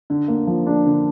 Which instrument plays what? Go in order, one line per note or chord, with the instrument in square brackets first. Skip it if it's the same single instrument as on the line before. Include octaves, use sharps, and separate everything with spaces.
[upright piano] D3
A#3
F3
D4
D3